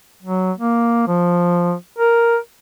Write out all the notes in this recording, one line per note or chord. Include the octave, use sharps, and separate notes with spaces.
F#3
A#3
F3
A#4